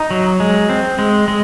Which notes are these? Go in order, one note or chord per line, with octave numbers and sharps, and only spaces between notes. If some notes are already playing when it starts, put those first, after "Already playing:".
Already playing: D#4
F#3
G#3
C4
G#3
G#3